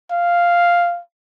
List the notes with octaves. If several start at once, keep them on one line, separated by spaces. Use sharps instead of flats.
F5